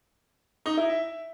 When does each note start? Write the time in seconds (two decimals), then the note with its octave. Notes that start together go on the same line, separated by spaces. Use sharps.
0.66 D#4
0.77 E4
0.89 E5